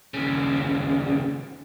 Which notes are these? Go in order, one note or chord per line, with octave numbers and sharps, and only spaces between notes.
D#2 C#3